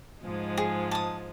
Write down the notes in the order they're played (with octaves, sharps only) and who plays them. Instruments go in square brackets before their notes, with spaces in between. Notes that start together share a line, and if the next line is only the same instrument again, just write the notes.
[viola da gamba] G#2 F3 G#3
[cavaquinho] G#4
A5 D#6